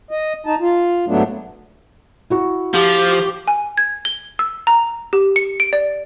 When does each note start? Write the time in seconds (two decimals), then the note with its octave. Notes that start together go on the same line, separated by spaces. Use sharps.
0.11 D#5
0.46 D#4 A5
0.61 F4
1.08 G#2 F#3 A3 B3 D4
2.30 E4 F#4 C#6
2.74 F3 G4
3.48 G#5
3.77 G#6
4.05 G7
4.39 E6
4.67 A#5
5.13 G4
5.36 C#7
5.60 D7
5.73 D5